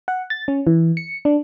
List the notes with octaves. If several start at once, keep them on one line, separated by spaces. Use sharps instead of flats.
F#5
A6
C#4
E3
C#7
D4